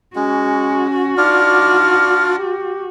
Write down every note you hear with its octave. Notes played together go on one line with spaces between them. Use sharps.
G#3 C#4 F#4
D4 D#4 F4 D5 F6
G4